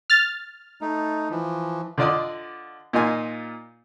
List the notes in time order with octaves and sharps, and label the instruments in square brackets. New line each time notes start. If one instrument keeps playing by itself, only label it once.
[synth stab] F6 A6
[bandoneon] A3 D#4
E3 F3
[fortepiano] D3 F4 D5 D#5 D#6
A#2 D#4 F4 G#5